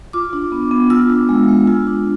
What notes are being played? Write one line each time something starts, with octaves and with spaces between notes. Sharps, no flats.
F4 D6
D4
B3
B3
F4 E6
D4
G#3
G#3
F4
D4